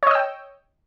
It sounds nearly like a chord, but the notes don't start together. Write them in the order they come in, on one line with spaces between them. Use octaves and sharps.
C#5 D#5 E6 G5